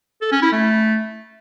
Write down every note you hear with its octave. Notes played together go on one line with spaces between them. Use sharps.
A4
C#4
E4
A3